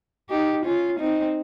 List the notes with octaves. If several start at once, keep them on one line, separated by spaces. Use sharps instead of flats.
D#4 G4
C#4 F4
C4 D#4